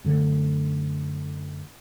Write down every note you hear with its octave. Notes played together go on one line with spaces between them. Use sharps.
F#2 D3 A3